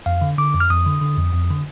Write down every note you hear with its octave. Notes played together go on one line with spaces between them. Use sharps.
F2 F5
D3
D3 D6
F2
F6
F2 D#6
D3
D3
F2
F2
D3